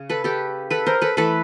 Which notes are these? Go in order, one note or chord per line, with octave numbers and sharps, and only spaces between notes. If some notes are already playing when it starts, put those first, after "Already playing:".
Already playing: C#3
A4 B4
G4 A4
A4 B4
A#4 C5
A4 B4
E3 A3 A4 B4